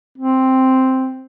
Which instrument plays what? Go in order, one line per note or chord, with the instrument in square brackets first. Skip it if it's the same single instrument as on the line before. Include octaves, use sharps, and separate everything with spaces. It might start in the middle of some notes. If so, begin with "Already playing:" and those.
[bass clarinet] C4